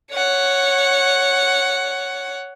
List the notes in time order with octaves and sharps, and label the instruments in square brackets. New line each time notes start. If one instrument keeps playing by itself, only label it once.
[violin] C#5 F#5